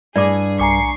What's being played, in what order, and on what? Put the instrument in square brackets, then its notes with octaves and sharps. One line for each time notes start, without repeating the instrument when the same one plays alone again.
[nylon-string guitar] G2 [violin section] G#4 [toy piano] D5 D6
[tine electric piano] B1 G#5 A#5 [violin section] C#6 C7 [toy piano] D6